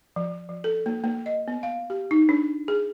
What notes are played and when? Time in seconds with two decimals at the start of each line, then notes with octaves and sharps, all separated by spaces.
0.16 F3
0.49 F3
0.64 A4
0.86 A#3
1.04 A#3
1.26 D#5
1.48 B3
1.63 F5
1.90 G4
2.11 D#4
2.29 D4
2.68 G#4